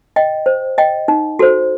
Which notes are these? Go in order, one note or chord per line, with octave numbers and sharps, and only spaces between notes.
D#5 G5
C5
D#5 G5
D#4
F#4 A4 C5